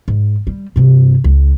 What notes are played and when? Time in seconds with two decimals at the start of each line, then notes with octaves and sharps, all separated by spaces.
0.08 G#2
0.47 G3
0.76 G2 C3
1.24 C#2